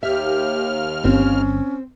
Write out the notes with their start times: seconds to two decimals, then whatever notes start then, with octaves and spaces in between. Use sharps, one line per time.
0.03 D#2 G4 E5 F6
1.04 G1 C4 C#4